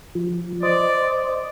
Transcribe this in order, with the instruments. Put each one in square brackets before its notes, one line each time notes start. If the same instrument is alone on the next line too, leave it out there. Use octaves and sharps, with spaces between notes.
[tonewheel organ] F3
[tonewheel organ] C5 D#5 [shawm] D5